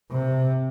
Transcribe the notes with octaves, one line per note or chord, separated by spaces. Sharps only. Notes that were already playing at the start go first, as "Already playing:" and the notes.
C3